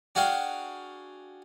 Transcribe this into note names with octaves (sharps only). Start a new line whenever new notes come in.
D4 F#4 G#4 F5 G5